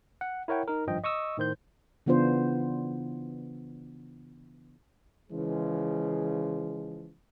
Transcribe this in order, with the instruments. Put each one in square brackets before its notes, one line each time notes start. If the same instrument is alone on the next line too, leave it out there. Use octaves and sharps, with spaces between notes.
[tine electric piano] F#5
E4 A#4 C#5 F#5 G5
D#4 A#4
G#1 G2 F3 D#5 G5
D#5 C#6 D#6 E6
A2 D#3 C5 G6
[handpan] C#3 E3 B3 D4 F4 C5
[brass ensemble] C#3 E3 F3 G#3